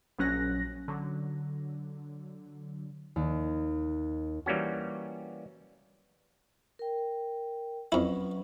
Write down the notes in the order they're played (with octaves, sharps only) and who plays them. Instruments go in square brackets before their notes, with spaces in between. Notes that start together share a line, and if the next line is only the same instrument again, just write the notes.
[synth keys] A#1 F#3 C#4 F#6 A#6
D3 F#3
[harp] D#2
[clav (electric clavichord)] E3 G3 A#3 C#4 F#4
[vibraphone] A#4 G5
[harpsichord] F2 E4 [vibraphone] F#3 C#4 B4